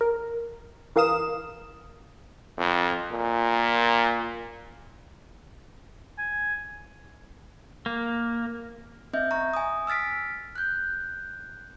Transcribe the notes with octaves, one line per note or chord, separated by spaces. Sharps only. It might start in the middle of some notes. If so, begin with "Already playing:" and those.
A#4
E3 A#4 F5 D#6 E7
F2
A#2
G#5
A#3
C4 D#5 E5 G6
A#5 C#6
G#5 D#6
E6 F6 A6 B6 D7
F#6 G6